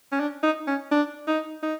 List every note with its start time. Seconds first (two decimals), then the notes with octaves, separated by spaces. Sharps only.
0.12 C#4
0.19 D4
0.43 D#4
0.67 C#4
0.91 D4
1.27 D#4
1.63 D#4